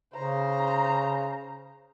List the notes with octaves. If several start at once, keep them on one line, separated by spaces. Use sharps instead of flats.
C#3 C5 A#5